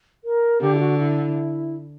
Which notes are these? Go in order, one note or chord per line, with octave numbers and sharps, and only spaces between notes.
A#4
D3 G4
E4
F#4
E4